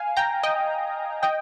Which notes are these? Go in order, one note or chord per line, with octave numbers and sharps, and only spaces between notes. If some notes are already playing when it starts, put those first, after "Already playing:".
Already playing: F5 G#5
G5 A#5
D#5 G5
D#5 G5